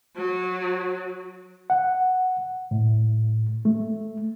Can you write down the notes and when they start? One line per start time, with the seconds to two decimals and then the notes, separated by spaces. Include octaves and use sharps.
0.16 F#3
1.70 F#5
2.71 A2
3.65 A3